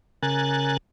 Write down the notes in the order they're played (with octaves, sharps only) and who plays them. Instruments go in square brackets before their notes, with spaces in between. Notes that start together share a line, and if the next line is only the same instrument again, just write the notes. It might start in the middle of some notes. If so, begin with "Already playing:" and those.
[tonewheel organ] C#3 A#4 G#5 F#6 A6